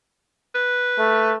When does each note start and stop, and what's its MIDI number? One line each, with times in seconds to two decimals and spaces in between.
0.55 1.32 71
0.98 1.37 57